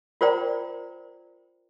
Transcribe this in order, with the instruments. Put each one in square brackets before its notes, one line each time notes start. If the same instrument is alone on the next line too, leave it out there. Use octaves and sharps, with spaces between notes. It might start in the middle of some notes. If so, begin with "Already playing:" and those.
[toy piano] F4 A#4 C5 D5 G5 A#5